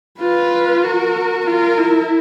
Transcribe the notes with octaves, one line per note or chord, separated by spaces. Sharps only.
F4 B4
F#4 A#4
F4 A#4
E4